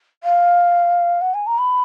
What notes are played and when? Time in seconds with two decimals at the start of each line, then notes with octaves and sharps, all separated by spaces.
0.23 F5
1.21 F#5
1.34 G#5
1.47 A#5
1.58 B5